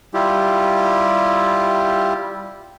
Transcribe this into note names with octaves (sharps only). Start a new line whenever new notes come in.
G3 E4 F4 G4